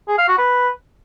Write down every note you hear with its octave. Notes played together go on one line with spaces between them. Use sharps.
G#4
F5
F#4
B4